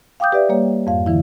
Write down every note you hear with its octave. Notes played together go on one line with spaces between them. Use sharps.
F5 G5 D6 D#6 G6
G4 B4 D5 E5
G3 A#3 C#5
F2 G#2 F5
D3 E3 E4